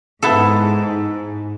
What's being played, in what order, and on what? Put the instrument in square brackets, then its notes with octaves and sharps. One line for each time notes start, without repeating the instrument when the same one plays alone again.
[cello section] G#2 [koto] B3 E4 A4